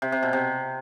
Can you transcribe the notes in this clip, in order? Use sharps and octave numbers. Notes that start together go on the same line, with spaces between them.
C3
C3
B2
C3